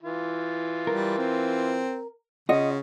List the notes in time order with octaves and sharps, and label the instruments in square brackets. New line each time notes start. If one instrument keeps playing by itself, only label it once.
[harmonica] E3 F4
[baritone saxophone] G3 [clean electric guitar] A#4
[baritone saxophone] C4
[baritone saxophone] C#3 [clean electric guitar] F4 F#5 [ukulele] D#5